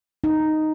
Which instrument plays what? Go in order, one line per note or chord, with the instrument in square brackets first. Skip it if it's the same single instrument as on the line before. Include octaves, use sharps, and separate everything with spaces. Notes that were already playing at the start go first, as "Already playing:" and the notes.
[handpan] D#4